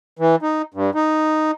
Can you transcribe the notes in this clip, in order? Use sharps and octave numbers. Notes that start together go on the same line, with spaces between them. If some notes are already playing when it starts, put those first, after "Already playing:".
E3
D#4
G2
D#4